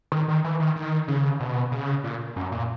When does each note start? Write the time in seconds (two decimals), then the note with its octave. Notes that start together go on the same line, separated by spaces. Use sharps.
0.12 D#3
0.28 D#3
0.44 E3
0.60 D#3
0.76 D#3
1.08 C#3
1.40 B2
1.72 C#3
2.04 A#2
2.36 F#2
2.52 A#2